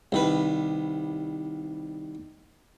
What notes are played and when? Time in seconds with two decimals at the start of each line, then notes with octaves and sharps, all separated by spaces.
0.12 C2 D#3 B4